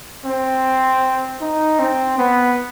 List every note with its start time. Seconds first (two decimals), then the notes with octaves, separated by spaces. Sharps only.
0.25 C4
1.41 D#4
1.79 C4
2.18 B3